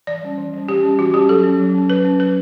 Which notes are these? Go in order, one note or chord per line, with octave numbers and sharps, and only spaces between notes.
E3 D5
G3 C#4
E3
G3 C#4
E3 G4
G3 C#4
E3 F#4
G3 C#4 G4
F#3 A4
C#4
F#3
C#4
F#3 B4
C#4
F#3 B4